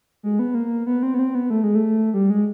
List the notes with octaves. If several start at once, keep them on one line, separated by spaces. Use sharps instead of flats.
G#3
B3
A#3
B3
C4
B3
C4
B3
A3
G#3
A3
G3
G#3